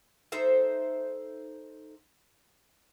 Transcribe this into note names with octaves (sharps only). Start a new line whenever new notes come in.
D#4 A4 C5 E5